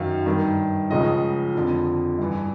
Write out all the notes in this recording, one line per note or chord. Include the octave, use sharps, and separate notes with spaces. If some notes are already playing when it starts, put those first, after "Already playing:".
Already playing: F#2 D#3 F5
G2 D#3
C#2 C#3 F3 D#5
F2 D3 F3
G2 E3